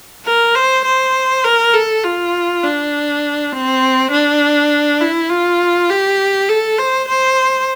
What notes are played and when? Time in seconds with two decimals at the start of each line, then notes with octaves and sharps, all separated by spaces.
0.25 A#4
0.55 C5
0.85 C5
1.44 A#4
1.73 A4
2.03 F4
2.63 D4
3.52 C4
4.11 D4
5.00 E4
5.30 F4
5.89 G4
6.49 A4
6.78 C5
7.08 C5